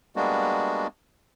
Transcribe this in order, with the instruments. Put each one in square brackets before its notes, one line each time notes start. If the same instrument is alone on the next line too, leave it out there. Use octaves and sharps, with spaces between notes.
[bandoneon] G3 G#3 A#3 B3 D4 F#4